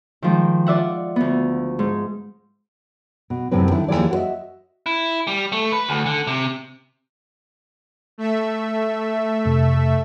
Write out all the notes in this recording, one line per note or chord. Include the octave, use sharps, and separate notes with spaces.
D#3 F3 G#3
F4 D5 E5 F#5
D2 B3
G#2
B2
F#2 A2 C3 C4 B4
D3 D#3 E4
D#2 A2 E3 F3 G#4 D5
F#4 A#4 C5 D#5 E5
E4
G3
A3
B4
D2
D3
C3
A3 E5
F2 C3